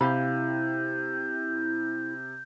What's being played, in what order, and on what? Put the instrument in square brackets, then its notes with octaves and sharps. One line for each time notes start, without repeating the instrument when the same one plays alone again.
[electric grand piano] C3 [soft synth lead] E4 [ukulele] G4 F5 B5 [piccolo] G6